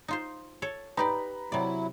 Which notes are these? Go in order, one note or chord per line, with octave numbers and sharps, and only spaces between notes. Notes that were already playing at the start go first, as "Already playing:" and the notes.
D#4 F4 C5
A4 C#5
D#4 G4 B4 D5 A#5 B5
C3 F#3 E4 D5